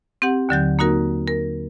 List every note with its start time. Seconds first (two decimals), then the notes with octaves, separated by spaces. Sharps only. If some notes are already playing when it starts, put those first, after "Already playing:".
0.22 C4 G4 F#5
0.49 D#2 D3 F#3 G6
0.79 A#3 D#4 F#4 A#4
1.28 A#4